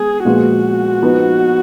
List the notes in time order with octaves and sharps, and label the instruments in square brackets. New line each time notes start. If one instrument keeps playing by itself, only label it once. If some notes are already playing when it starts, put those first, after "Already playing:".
Already playing: [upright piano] G#3 B3 [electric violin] G#4
[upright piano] A#2 F3 G#3 B3 F4 [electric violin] F#4
[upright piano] F3 B3 D#4